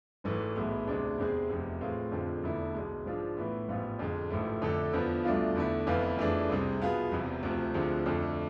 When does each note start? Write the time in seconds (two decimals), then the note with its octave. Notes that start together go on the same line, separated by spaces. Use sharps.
0.24 G#1 G#2 E3 A3
0.56 B1 A2 E3 G#3 B3
0.87 D2 C3 G#3 D4
1.18 E2 C3 G#3 C4 G#4
1.49 F1 E2 C3
1.81 A2 E3 G#3 C4 F4
2.12 F2 D3 F3 G#3 C4
2.43 E1 E2 D3 A3 E4
2.74 B1 B2 G#3
3.06 G#2 F3 G#3 D4 F4
3.37 A2 E3 B3
3.68 A1 G#2 F3 B3 F4
3.99 F2 D3 G#3
4.31 A1 G#2 F3 A3 E4
4.61 F2 D3 A3 D4 A4
4.93 E2 D3 F3 B3
5.24 C2 B2 A3 D4 F4
5.55 E2 D3 A3 E4
5.87 F1 F2 E3 B3 F4
6.18 F2 E3 A3 D4 G#4
6.49 C2 C3 G#3
6.80 B2 B3 F4 G#4
7.12 E1 E2 C3
7.43 D2 C3 F3
7.74 D2 D3 F3 G#3 C4
8.06 F2 D3 A3 D4 A4